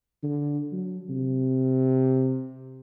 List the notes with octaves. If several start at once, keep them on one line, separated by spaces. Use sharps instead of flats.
D3
F#3
C3